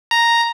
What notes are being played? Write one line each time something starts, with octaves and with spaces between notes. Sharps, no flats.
A#5